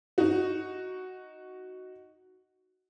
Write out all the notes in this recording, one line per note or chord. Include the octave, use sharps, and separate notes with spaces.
D#4 F#4